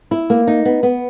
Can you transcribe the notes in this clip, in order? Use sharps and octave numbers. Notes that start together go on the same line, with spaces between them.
E4
A#3
D#4
B3
B3